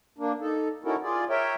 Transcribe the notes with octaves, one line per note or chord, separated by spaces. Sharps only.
A#3 D4
D#4 A4
C#4 D#4 E4 F#4 A4 A#4
F4 G#4 D5
A#4 C#5 E5 G5